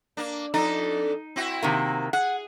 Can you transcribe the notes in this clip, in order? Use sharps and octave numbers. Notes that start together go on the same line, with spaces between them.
A#3 D4
F2 D4 D#4 A4
C4 E4 F#4
C3 D#3 A#3
G#4 F#5